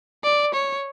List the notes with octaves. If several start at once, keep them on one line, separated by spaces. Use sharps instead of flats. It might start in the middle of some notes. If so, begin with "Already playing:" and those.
D5
C#5